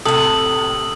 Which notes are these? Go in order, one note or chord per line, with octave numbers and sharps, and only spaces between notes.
A2 C3 A4 D#6 F#7